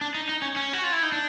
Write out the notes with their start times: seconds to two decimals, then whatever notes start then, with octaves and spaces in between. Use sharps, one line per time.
0.01 D4
0.14 D#4
0.29 D#4
0.42 C#4
0.56 C#4
0.73 F#4
0.84 F4
0.92 E4
1.03 D#4
1.12 D4